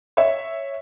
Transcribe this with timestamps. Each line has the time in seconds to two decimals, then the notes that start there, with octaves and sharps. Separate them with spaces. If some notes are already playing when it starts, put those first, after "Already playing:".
0.17 C#5 E5